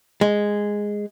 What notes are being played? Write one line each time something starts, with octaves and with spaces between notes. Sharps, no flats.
G#3